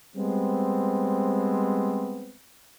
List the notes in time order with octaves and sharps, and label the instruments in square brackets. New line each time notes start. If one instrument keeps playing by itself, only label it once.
[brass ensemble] G3 G#3 B3 C4